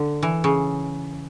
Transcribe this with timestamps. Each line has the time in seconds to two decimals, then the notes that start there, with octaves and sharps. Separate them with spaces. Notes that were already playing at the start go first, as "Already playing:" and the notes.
Already playing: D3
0.23 E3
0.44 C#3